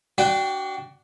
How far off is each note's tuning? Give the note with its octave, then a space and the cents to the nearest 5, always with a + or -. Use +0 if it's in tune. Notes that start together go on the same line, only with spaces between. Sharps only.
D4 +0 F#4 +25 G5 +0